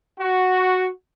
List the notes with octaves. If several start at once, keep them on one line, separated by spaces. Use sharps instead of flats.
F#4